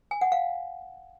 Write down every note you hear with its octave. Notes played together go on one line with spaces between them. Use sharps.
G#5
F#5
F5